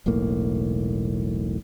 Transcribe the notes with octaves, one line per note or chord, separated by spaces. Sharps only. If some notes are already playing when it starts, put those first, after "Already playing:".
E1 B1 A2 A#3